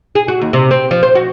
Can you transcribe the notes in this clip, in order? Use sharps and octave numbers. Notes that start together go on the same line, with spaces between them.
G#4
F#4
D#2
C3
C4
F3
C5
F#4